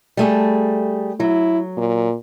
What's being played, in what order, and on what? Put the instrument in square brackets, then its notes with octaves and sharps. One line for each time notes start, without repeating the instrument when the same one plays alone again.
[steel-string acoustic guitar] G3 A3 G#4
[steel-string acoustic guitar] F#3 [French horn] E4
[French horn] A#2